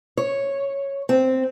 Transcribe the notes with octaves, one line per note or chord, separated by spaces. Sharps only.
C#5
C4